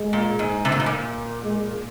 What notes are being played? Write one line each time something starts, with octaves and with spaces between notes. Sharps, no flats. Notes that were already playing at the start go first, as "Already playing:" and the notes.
Already playing: G#3
A#2
G#2
C3
A#2
G#2
A#2
G#3